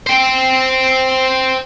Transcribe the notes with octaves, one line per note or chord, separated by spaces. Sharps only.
C5 G5